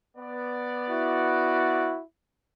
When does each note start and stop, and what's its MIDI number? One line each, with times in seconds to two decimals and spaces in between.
0.17 1.94 59
0.17 1.94 74
0.90 2.04 64
0.90 2.01 66